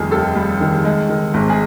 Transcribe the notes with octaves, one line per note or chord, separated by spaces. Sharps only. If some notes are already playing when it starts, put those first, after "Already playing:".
Already playing: F1 D#3 G3 G#4
D#2 A4
G3
D#3
G#3
D#3
G#1
G#4